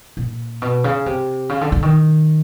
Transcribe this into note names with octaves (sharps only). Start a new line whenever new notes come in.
A#2
B2
C#3
C3
C#3
D3
D3
D#3